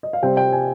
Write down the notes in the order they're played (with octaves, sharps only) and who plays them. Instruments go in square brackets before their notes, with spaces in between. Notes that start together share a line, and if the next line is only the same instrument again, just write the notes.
[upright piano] D#5
F5
C3 G3 C4 G5
G5
G#5